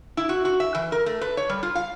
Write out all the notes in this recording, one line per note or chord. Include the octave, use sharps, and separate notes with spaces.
E4
F#4
F#4
E5
E3
A#4
A3
B4
C#5
G3
F4
F5